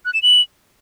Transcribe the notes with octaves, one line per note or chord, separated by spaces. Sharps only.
F#6
E7
F#7